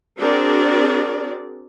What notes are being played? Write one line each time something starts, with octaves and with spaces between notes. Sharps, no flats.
C4 D4 F#4 G#4 A#4 D5